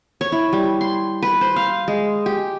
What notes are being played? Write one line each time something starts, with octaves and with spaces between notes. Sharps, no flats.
C#5
E4
G3
C6
B4
C5
F5
G#3
G4